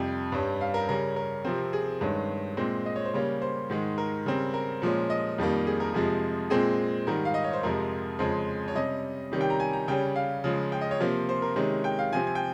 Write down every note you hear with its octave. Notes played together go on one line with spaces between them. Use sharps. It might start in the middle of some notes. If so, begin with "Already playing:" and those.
Already playing: F2 C3 G3 G5
G2 G3 C#4
F5
A#4
C#3 G3 C#4 A#4
A#4
C3 F3 C4
G#4
G2 D#3 G#3 C#4
A#2 G#3 C4
D#5
C#5
C5
C#3 G3 A#3 C#5
C5
G#2 D#3 G#3
A#4
C#3 G3 C4
A#4
A#2 F3 G#3 C#4
D#5
F2 D#3 G3 A#3
G#4
A#4
F2 C3 F3 G#3 G#4
A#2 G#3 C4 G#4
G#2 D#3 G3 A#4
F5
D#5
C#5
C5
F2 C3 F3 G#3 A#4
F2 C#3 G#3 C5
C#5
C3 G3 C#4 D#5
C3 D#3 G3 C#4
G5
A#5
G#5
A#5
C#3 G3 C#4 G5
F5
C#3 F3 G#3
G5
D#5
C#5
C3 F3 A#3 C5
C5
A#4
C3 D#3 G#3 C#4
G5
F5
C3 F3 C4 G#5
G#5
G5